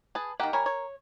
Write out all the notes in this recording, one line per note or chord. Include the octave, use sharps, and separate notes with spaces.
G#4 B4 A5
D#3 A#3 G4 F#5
G3 A#4 C#5 G#5
C#5